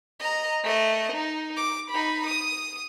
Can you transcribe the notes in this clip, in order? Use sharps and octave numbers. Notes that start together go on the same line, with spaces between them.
D#5 A#5
A3 D#5
D#4
D6
D#4 B5
D#6